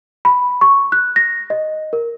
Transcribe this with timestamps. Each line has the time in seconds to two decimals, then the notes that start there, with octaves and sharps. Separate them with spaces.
0.25 B5
0.61 C#6
0.92 F#6
1.16 A#6
1.50 D#5
1.93 A#4